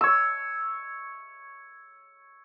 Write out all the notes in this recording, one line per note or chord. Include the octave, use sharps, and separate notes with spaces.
C#5 E6